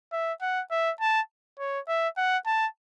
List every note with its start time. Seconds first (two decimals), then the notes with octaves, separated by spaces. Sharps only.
0.12 E5
0.42 F#5
0.71 E5
1.00 A5
1.59 C#5
1.88 E5
2.17 F#5
2.46 A5